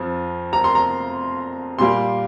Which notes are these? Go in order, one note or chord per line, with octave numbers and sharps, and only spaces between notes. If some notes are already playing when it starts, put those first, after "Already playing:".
Already playing: F2 F3
A#5
C6
A#5
A#2 G3 A#3 C6